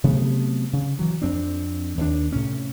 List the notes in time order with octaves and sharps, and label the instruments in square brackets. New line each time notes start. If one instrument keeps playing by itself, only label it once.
[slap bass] C3 F#3 A3 B3
C#3
E3 F#3
F2 C4 D4
D#2 A#3 D4
A2 C3 C#4